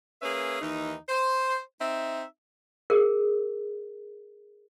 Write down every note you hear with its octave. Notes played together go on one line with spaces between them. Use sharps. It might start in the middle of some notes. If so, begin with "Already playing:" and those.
A#3 C#4 G#4 B4 E5
D#2 E3 D#4
C5
C4 D#4 E5
G#4 A#4